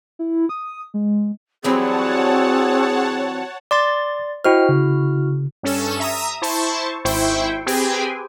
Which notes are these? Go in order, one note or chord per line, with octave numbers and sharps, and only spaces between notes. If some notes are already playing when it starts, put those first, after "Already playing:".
E4
D#6
G#3
E3 F#3 G3 C4 G#4 C#5 F#5 A5
D5 C6 D6 A6
E4 F#4 C5 D#5 G5 F6
C#3
G2 C#4 A4 E7
E5 A#5 D#6
E4 C5 A5 C#6
G#1 E4 C5 G5 C#6
C4 G4 G#4 B4 G5 G#5